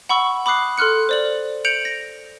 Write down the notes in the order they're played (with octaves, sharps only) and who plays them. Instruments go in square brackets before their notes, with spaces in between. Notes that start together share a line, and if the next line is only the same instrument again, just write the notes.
[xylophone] F#5 B5 C#6 E6
B5 D6 D#6 F#6 C7
A4 C6 F6 F#6 C#7
C5 D5 F#7
G6 C#7 D7 F7 F#7
A#6